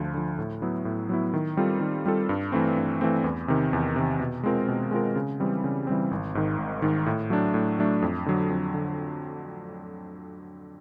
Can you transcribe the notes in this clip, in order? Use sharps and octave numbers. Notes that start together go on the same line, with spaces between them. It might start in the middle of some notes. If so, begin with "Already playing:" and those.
Already playing: D2 D3 F3
D3 F3
A2
F#3 B3 E4
A2
F#3 B3 E4
D#3
G3 C4 F4 A4
D#3
G3 C4 F4 A4
G2
E3 A3 C4
G2
E3 A3 C4
E2
C3 D#3
E2
C3 D#3
B2
G#3 C4 F4 A#4
B2
G#3 C4 F4 A#4
C#3
E3 G3 C4
C#3
E3 G3 C4
G#1
G#2 D#3
G#1
G#2 D#3
A2
F#3 A3 D4
A2
F#3 A3 D4
F2
D3 F#3
F2
D3